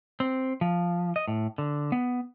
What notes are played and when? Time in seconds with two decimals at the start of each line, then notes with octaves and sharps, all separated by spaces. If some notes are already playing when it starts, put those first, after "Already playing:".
0.20 C4
0.61 F3
1.16 D#5
1.28 A2
1.58 D3
1.92 B3